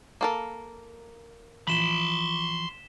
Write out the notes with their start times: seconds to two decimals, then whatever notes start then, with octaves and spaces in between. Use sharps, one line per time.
0.21 A#3 A4 A#4
1.67 E3 F3 B5 C6 B6 E7 G7